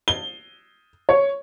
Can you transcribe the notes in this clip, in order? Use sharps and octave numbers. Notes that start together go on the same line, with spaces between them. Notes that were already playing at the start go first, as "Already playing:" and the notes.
G7
C#5